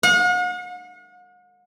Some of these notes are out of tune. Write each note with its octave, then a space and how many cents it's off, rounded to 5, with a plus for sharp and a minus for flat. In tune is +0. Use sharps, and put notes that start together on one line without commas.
F#5 -45